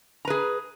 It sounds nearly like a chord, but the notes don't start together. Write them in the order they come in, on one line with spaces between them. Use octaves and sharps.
A#5 B4 G#4